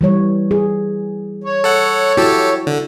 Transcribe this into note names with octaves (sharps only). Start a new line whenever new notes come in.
E3 G3 C#5
G#4
C#5
A4 F#5
E4 F#4 G4 A4
D3